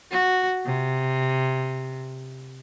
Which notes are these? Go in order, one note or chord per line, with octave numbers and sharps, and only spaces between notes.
F#4
C3